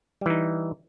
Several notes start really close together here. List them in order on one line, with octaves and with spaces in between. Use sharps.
G3 E3 D#4